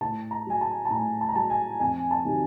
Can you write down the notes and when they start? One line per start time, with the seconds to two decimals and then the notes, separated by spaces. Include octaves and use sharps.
0.01 A2 A5
0.31 A#5
0.47 F#3 G#5
0.61 A5
0.85 A5
0.90 A2 A#5
1.21 A5
1.29 A#5
1.35 F#3 A5
1.50 G#5
1.80 F2 G#5
2.11 A5
2.25 C3 D#3 F#3